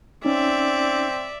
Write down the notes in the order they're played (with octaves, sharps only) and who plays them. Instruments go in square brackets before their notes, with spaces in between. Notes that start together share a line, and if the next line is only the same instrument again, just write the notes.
[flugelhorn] C4 [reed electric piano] C#4 D#4 [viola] D5 E5